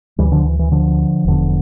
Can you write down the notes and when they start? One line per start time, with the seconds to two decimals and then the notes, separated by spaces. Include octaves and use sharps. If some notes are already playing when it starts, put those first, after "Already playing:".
0.19 D2 D3 E3 G3
0.32 D3 F3
0.45 E3
0.59 E3
0.72 D3 F3
1.24 E1 E2 D3